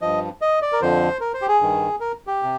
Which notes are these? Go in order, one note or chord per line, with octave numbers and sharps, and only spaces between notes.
G2 F3 D#5
D#5
D5
A#4
F2 D3 F3 C5
A#4
C5
G4
G#4
G2 D#3
A#4
G4
C3